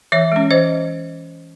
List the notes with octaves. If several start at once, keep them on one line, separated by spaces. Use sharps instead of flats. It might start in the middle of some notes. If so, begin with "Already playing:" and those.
E3 C#5 E5
G#3 C#4
E3 C5 D#5